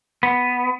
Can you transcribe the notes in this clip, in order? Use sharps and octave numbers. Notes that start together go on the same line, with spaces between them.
B3